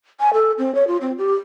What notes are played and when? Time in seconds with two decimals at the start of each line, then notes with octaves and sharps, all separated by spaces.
0.20 G#5
0.33 A4
0.58 C4
0.75 C#5
0.87 F4
1.01 C4
1.18 G4